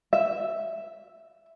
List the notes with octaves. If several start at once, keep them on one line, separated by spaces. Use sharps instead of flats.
E5